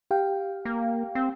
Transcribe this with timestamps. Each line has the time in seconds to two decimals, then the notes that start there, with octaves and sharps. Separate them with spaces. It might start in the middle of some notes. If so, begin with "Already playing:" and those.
0.11 G4 F5 G5
0.65 A#3
1.15 C4